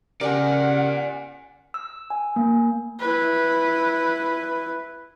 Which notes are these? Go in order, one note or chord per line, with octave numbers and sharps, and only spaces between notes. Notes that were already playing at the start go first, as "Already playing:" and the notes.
C#3 G4 A#4 D5 F#5 G#5
E6
G#5
A#3
E4 B4